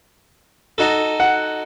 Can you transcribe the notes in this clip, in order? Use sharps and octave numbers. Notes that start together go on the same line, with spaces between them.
D#4 F#4 A4
F#5